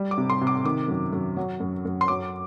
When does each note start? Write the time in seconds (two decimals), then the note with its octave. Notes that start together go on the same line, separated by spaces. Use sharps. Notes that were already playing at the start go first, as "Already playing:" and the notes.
Already playing: G3
0.11 D6
0.18 C3
0.30 C6
0.41 C3
0.47 D6
0.65 D#3 D6
0.88 F#2
1.13 F#2
1.37 F#3
1.60 F#2
1.85 F#2
2.01 C6
2.08 F#3 D6